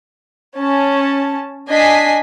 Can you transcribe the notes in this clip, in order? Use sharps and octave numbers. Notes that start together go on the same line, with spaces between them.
C#4 A5
D4 D#5 G#5 B6 C7